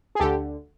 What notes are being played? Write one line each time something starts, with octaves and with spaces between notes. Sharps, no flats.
G#4
D2 D3 G4 A4